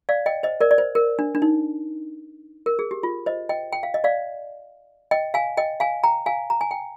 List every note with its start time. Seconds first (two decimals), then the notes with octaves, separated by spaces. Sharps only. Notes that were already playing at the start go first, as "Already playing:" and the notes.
0.09 D5 F5
0.26 D#5 G5
0.43 C5 D#5
0.61 A#4 D5
0.71 D5
0.78 C5
0.95 A#4
1.19 D4
1.35 D4
1.42 D#4
2.66 A#4
2.79 G#4
2.91 G4
3.03 F4
3.26 C5 D#5
3.49 D#5 G5
3.72 G5
3.83 F5
3.94 D#5
4.04 D5 F5
5.11 D#5 G5
5.34 F5 G#5
5.57 D#5 G5
5.80 F5 G#5
6.03 G5 A#5
6.26 F5 G#5
6.50 A#5
6.61 G#5
6.71 G5